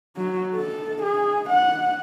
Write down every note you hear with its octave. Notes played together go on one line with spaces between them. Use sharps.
F#3
A4
G#4
F#5